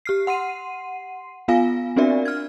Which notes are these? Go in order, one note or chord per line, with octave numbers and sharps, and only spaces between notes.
G4 F6 C7
F#5 C6 C7 D#7
B3 F4 F5 G#5 A#6
C4 D4 F#4 A#4 D5 E5
F6 G#6